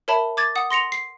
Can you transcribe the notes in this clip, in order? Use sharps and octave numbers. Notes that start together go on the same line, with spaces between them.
A#4 C#5 E5 A5 B5
D6 G#6 A6
F#5 D#6
C6 A#6 C#7 F7
C7